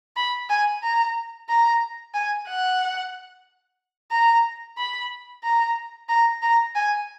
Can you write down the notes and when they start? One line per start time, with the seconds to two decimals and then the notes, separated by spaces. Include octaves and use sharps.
0.17 B5
0.50 G#5
0.83 A#5
1.49 A#5
2.14 G#5
2.48 F#5
4.11 A#5
4.77 B5
5.44 A#5
6.09 A#5
6.42 A#5
6.75 G#5